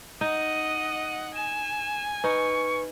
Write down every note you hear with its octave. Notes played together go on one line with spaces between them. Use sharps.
D#4 D#5 F#5 D#7
G#5 E7
D#4 B4 C#6